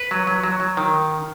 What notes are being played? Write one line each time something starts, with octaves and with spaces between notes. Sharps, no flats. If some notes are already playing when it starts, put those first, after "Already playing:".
Already playing: B4
F#3
F#3
F#3
F#3
D#3